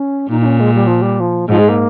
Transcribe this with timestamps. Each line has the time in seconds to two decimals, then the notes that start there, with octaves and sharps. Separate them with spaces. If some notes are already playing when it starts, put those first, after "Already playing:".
Already playing: C#4
0.29 A#2 D#4
0.40 D#4
0.45 C#4
0.60 G#3
0.74 G3
0.86 F3
1.01 G3
1.20 F3
1.49 G#2 F3
1.58 G#3
1.68 A#3